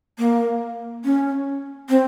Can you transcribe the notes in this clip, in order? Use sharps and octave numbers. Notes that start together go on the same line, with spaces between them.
A#3
C#4
C4